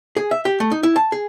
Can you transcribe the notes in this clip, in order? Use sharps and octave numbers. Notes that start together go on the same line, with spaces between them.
G#4
E5
G4
A3
D#4
E4
A5
G#4